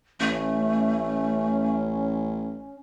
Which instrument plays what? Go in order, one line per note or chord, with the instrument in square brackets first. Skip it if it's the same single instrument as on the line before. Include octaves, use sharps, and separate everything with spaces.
[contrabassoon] A1 [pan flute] A3 [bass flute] C#4